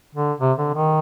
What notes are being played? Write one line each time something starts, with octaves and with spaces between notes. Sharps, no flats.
D3
C3
D3
D#3